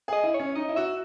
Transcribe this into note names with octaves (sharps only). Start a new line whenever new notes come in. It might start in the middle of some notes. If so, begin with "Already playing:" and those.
G#4 D#5
E4
C#5
C#4
D#4 D#5
E4
F#4 E5